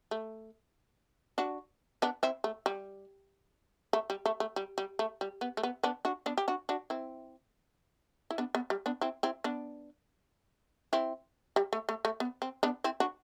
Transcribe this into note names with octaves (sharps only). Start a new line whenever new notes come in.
A3
D4 F#4
B3 D4
C4 E4
A3
G3
A3
G3
A3
A3
G3
G3
A3
G3
B3
A3
B3
B3 D4
D4 F#4
B3 D4
G4
D4 F#4
D4 F#4
C4 E4
E4
B3 D4
B3
G3
B3 D4
C4 E4
C4 E4
B3 D4
C4 E4
G3
A3
A3
A3
B3
C4
B3 D4
C4 E4
D4 F#4